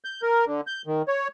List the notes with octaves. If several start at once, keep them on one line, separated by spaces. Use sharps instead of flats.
G6
A#4
D3
G6
D#3
C#5